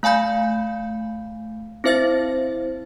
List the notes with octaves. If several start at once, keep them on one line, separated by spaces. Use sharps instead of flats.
A3 F5 G#5 B5 G6
C4 E4 C5 E5 A6 A#6